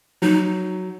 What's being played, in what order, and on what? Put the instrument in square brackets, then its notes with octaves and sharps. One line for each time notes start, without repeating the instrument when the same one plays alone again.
[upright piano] F#3 [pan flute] D#4